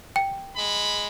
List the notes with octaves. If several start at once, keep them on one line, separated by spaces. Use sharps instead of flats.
G5
G#3 B5